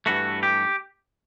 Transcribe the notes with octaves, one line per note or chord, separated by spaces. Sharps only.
G2 E3 A3 F#4
G4